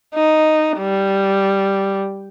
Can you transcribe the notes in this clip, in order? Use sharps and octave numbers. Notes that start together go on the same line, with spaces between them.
D#4
G3